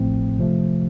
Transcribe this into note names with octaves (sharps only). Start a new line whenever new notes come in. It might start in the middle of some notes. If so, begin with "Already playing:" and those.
Already playing: A1 A2 F3 A3 C4
C3 F3 A3